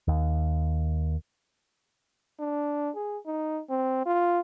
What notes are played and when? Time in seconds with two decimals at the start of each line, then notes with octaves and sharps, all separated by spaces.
0.08 D#2
2.40 D4
2.96 G#4
3.26 D#4
3.70 C4
4.06 F4